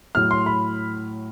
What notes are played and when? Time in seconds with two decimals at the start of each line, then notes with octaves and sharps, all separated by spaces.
0.15 A2 F#3 F6
0.31 C6
0.46 B5